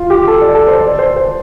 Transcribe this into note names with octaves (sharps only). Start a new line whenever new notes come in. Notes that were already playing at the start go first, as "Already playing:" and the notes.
Already playing: F4
G4
A4
D5
A4
C5
D5
C5
C5